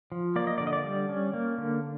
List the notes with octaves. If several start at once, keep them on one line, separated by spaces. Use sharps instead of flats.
F3
A#3 D5
D#5
D3 D5
D#5
D5
G3
C#4
A#3
D3